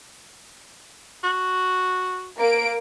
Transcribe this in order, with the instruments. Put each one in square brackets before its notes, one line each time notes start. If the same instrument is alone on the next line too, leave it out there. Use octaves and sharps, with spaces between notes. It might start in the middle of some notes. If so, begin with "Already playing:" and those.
[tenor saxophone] F#4
[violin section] A#3 D7